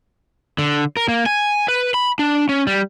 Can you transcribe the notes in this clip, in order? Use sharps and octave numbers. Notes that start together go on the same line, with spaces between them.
D3
A#4
A#3
G#5
B4
B5
D4
C#4
G3